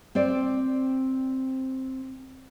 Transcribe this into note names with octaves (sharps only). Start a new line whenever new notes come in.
C4 C5 D5